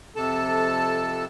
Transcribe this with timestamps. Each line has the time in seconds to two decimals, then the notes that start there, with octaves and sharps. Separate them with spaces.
0.16 F2 C3 A4 A5